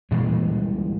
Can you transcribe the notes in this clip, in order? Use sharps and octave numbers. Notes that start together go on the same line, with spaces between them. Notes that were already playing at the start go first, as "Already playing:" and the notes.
A#2 E3 G3 G#3